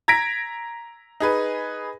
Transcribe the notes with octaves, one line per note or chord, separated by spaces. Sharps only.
A#5 G#6 A#6 B6 D7
D#4 G#4 B4